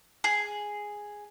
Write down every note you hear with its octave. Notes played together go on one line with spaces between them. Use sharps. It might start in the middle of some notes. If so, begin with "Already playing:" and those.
G#4